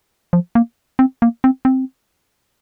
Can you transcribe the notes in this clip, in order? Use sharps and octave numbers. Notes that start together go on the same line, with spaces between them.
F3
A#3
C4
A#3
C4
C4